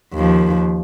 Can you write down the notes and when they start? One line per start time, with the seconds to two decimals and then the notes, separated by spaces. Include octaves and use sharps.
0.14 D#2 F3